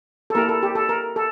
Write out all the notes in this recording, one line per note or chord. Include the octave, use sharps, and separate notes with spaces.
A4
A#3 E4 G4 A#4
A4
G4
A4
A#4
A4